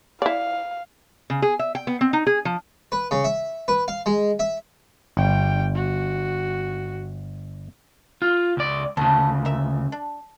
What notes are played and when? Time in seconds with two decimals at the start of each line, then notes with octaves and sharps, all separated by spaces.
0.22 E4 D5 F5
1.30 C#3
1.42 G#4
1.59 E5
1.75 G5
1.87 B3
2.01 C4
2.13 D#4
2.27 G#4
2.45 F3
2.92 B4
3.11 C#3
3.24 E5
3.68 B4
3.88 F5
4.06 G#3
4.39 E5
5.17 G1 G3 G5
5.75 F#4
8.22 F4
8.57 C#2 D5
8.97 D2 C#3 F#3 A3 A5
9.45 A#4 E5
9.92 D4